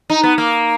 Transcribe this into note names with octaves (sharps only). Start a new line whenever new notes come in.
D#4
B3
A#3